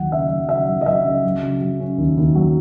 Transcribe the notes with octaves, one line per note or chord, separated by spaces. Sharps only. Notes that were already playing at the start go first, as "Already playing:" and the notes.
Already playing: D#2 F#3 F#5
C#3 E5
F#3
C#3 E5
F#3
D#5
F#3 E5
C#3
F#3
C#3
F#3
C#4
D#2
D#2
F#3